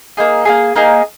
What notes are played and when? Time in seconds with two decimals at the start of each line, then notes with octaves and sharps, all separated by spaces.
0.17 A#3 D#4 G#4
0.45 A#3 D#4 G#4
0.76 A#3 D#4 G#4